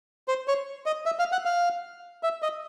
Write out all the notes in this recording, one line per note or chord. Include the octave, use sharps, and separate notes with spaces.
C5
C#5
D#5
E5
F5
F#5
F5
E5
D#5